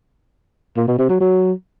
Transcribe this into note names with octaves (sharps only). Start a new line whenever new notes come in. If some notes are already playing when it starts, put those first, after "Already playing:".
A#2
B2
C3
F#3
F#3